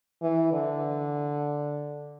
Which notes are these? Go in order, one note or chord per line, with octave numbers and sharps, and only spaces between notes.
E3
D3